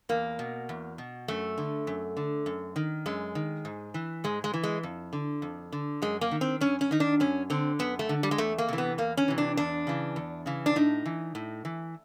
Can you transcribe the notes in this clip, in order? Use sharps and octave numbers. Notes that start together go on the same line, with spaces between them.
E2 A#3
B2
E2
B2
F#2 A3
D3
F#2
D3
F#2
D#3
F#2 G#3
D#3
G#2
E3
G#2 G#3
G#3
E3
G#3
F2
D3
F2
D3
F#2 G#3
A#3
D#3
C4
F#2 C#4
C#4
D#3 D#4
D4
F#2 C#4
D3 C4
F#2 B3
A3
D3
G3
G#3
E2 A3
A#3
C3 E3
B3
E2 A#3
C#4
C3 E3
D4
E2 D4
C#3 E3
E2
C#3 E3
D4
A2 D#4
E3
A2
E3